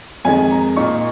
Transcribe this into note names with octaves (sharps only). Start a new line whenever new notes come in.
F2 D#3 G#3 G#5
A#5
A#2 A#3 D#4 C#6